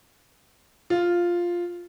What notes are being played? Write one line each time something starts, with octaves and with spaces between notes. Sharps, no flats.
F4